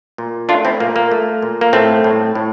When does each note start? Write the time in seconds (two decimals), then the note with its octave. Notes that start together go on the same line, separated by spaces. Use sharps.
0.18 A#2
0.49 A3 D4 F4
0.65 C4 E4
0.80 A#2 A#3
0.96 A#3
1.11 A3
1.42 A#2
1.61 A#3
1.73 A2 A3 C4
2.04 A2
2.35 A2